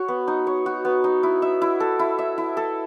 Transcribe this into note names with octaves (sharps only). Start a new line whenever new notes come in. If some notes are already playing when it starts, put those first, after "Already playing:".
Already playing: F#4 C#5
B3
D#4
C#5
F#4
B3
D#4
E4
E5
E4
A4
E4
E5
E4
A4